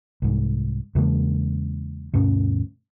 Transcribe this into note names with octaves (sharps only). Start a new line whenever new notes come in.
C2 G#2
E2 C#3 G#3 A#3
D2 G2 B2 C#4